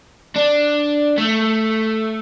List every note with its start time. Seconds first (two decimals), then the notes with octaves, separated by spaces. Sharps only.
0.36 D4
1.18 A3